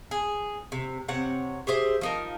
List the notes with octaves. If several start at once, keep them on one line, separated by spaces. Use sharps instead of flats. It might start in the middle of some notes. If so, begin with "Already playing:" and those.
G#4
C3
C3 C4 C#5 F#5
G4 G#4 C5 E5
F3 D#4 A#4